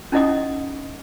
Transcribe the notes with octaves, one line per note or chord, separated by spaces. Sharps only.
C#4 D#4 E4 D#5 F#5 D#6